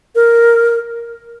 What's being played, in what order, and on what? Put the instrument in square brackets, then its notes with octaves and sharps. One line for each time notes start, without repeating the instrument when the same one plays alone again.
[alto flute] A#4